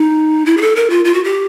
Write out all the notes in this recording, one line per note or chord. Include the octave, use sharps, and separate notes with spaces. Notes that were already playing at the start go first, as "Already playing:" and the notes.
Already playing: D#4
E4
G#4
A4
A#4
F4
F4
F#4
G4